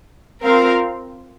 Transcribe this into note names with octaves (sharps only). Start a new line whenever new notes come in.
C4 F4 A#4 F5